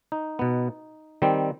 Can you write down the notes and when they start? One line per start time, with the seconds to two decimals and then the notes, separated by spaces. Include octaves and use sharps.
0.12 D#4
0.39 B2 B3
1.22 D#3 G3 C4